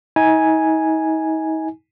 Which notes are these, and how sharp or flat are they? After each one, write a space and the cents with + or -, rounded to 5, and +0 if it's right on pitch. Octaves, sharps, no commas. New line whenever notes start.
D#4 +40 G#5 +0